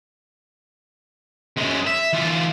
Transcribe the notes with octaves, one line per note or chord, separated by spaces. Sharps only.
F#2 G#3
E5
E3 F4